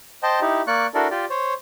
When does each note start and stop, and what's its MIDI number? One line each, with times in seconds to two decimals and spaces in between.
0.23 0.40 72
0.23 0.40 75
0.23 0.40 79
0.23 0.40 81
0.41 0.62 63
0.41 0.62 64
0.41 0.62 67
0.67 0.87 58
0.67 0.87 74
0.67 0.87 85
0.67 0.87 90
0.94 1.07 62
0.94 1.07 64
0.94 1.07 66
0.94 1.07 69
0.94 1.07 70
0.94 1.07 74
1.11 1.25 65
1.11 1.25 67
1.11 1.25 74
1.30 1.54 72
1.30 1.54 73